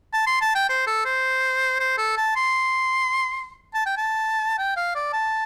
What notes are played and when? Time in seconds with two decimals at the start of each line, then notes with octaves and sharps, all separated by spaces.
0.13 A5
0.27 C6
0.41 A5
0.55 G5
0.69 C5
0.87 A4
1.05 C5
1.80 C5
1.98 A4
2.17 A5
2.36 C6
3.74 A5
3.86 G5
3.97 A5
4.58 G5
4.77 F5
4.95 D5
5.13 A5